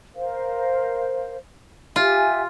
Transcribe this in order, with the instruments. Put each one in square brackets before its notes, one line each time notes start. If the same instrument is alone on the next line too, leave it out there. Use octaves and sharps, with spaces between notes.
[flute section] A#4 C5 F5
[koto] F4 [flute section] G4 E5 G#5